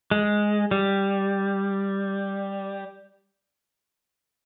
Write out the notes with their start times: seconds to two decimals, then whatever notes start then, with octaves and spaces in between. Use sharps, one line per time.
0.11 G#3
0.71 G3